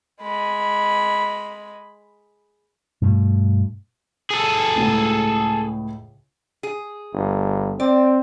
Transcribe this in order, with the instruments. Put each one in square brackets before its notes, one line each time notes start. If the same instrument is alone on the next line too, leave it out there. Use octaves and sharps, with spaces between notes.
[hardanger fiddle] G#3 B5
[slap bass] G2 B2 A3
[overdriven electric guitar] G#4 A4
[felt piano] C#2 A2 C#3
[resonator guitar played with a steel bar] G#4
[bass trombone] G1
[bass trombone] C4 [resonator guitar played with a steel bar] D5